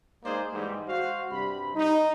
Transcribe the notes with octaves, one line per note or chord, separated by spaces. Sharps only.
G#3 A#3 D#4 G#4 C5 D5
G#2 E3 G3
F#4 C5 F5
G2 C3 G3 B5
D#4